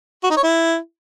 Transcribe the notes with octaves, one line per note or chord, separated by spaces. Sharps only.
F#4
D#4
C#5
E4